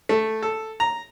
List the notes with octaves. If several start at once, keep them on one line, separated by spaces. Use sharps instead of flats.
A3
A4
A#5